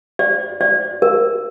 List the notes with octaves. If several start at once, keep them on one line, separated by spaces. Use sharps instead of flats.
D5
D5
A#4